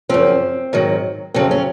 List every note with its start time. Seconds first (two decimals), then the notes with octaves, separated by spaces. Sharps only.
0.09 F#2 C#3 F3 C4
0.73 G#2 D#3 F#3
1.34 F2 C#3 F#3 C4
1.51 C#4